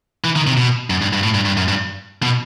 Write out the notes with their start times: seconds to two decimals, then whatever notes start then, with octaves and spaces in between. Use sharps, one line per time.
0.24 E3
0.36 D#3
0.47 C3
0.57 B2
0.90 F#2
1.02 G2
1.13 G2
1.23 A2
1.34 G2
1.45 G2
1.57 F#2
1.68 G2
2.23 B2